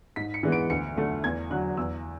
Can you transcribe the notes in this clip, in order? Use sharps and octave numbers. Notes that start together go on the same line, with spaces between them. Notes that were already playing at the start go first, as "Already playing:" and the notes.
G#2 B6
C#7
E3 G#3 B3
D7
D2 C#7
D3 A3
E2 G#6
D3 F#3 F#6
E2 E6